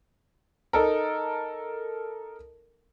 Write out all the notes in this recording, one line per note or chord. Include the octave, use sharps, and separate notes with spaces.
D#4 A4 A#4